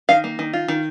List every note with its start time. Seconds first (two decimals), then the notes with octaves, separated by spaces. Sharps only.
0.09 D#3 F5
0.24 A#3
0.39 D#3
0.53 F4
0.68 D#3